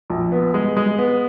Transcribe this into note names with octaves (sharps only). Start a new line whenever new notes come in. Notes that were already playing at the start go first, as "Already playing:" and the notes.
A#1
B3
G#3
G#3
B3